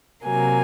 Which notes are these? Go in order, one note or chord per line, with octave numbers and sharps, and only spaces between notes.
C3 F#3 A#3 G#5